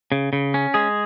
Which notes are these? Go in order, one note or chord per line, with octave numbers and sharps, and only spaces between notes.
C#3
C#3
C#4
G#3 G#4